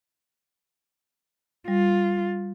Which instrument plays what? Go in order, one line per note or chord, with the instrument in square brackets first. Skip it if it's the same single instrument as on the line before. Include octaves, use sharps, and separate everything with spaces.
[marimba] G3 [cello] F4